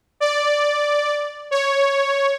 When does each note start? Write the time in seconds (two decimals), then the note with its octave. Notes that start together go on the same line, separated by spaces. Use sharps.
0.20 D5
1.51 C#5